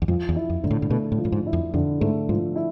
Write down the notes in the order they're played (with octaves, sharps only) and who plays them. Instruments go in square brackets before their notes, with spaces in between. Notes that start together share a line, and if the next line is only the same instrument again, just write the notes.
[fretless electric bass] E2
[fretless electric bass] F2 [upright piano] F3
[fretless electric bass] E2
[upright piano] E4
[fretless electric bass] F2
[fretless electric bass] G#2 [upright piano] D3
[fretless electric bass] A2
A2
[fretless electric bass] B2 [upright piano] A3
[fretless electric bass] A2
[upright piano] F3
[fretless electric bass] A2
G#2
[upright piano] E4
[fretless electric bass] F2
[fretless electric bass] F2 [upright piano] D3
[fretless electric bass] G#2 [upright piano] A3
[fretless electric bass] G#2 [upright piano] F3
[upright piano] E4